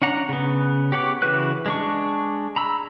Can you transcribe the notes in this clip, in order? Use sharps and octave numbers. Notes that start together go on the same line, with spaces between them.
C#4 D4 F#5 A#5
C#3 B3
G4 C#5 F#5 G#5 D6
C#3 E3 F#4 B4 F#6
G#3 D4 C#6
A#5 B5 E6